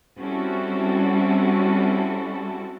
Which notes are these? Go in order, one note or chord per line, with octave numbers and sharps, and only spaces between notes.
G3 C4 C#4 E4 F#4 A4